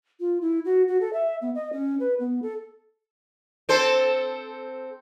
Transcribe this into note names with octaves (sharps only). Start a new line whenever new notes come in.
F4
E4
F#4
F#4
A4
E5
B3
D#5
C#4
B4
B3
A4
C4 A4 C5